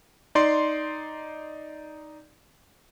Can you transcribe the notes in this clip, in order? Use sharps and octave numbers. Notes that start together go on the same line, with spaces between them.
D#4 D5 C6